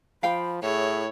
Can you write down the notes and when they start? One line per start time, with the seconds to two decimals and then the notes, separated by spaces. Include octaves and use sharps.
0.23 F3 F5 G5 B5
0.63 A2 E4 G#4 C#5